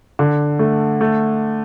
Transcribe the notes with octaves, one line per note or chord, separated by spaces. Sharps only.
D3
A3
A3